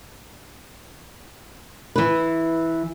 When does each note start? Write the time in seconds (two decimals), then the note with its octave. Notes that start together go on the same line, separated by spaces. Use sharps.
1.96 E3 B4